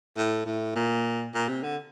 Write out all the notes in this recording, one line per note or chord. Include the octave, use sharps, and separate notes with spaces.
A2
A2
A#2
A#2
C3
D3